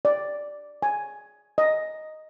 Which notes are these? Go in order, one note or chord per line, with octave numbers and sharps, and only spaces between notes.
D5
G#5
D#5